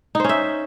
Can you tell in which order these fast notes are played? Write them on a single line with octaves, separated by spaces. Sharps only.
D#4 C5 C#4 E5